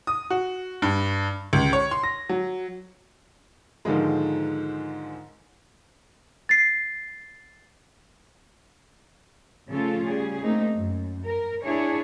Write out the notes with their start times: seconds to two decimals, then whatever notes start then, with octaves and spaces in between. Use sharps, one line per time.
0.07 D#6
0.30 F#4
0.82 G2
1.53 C#2
1.73 C#5
1.91 C6
2.03 A#6
2.30 F#3
3.85 G#2 D3 D#3 F3 G#3
6.49 A6 C7
9.69 C#3 F3 A3 C#4 F4 A4
10.03 C#3 G3 G#4
10.41 A3 A#3 C4 D#4
10.74 F#2
11.25 A#4
11.62 D4 E4 G#4 C#5